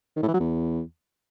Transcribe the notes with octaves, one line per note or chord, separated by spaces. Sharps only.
D#3
A2
E3
F#3
E2